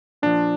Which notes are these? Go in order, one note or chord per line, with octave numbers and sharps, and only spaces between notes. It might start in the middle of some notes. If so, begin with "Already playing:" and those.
A#2 F3 D4